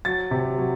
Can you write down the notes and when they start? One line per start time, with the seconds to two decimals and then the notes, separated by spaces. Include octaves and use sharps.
0.05 F#3 A6
0.31 C3
0.58 F#3